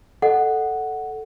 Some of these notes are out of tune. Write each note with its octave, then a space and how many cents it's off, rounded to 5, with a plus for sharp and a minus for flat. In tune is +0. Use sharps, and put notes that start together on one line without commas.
A4 +0 D#5 -25 F#5 +0